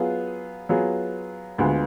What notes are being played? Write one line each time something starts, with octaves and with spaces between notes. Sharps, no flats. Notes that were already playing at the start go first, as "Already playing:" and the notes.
Already playing: F#3 B3 F4 G#4
F#3 B3 F4 G#4
D2 D3 G#3 B3 F4